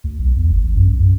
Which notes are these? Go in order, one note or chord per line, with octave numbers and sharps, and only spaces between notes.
D2
B1
E2
G1
A1
F#2
B1
F#2